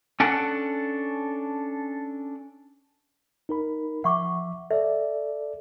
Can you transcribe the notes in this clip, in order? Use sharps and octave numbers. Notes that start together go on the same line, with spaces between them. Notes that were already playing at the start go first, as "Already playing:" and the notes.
C#4 D4 A4 F#5
D#4 A#4 B5
F3 E5 F#5 C#6 D6
A4 D5 E5